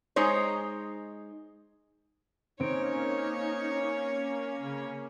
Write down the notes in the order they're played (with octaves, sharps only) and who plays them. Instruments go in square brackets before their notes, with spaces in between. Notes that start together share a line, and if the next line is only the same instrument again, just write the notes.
[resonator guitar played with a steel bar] G#3 D#4 C5 C#5
[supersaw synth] A#3 C#4 [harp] C4 D7 [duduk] D#4 [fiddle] C#5
[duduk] C#3